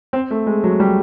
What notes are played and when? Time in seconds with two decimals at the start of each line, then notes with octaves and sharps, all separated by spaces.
0.13 C4
0.31 A3
0.46 G#3
0.64 F#3
0.80 G3